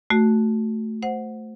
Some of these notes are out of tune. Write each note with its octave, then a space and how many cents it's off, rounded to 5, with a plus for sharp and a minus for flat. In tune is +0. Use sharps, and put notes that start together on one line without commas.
A3 +0 F#4 +0
C5 +0 F#5 -10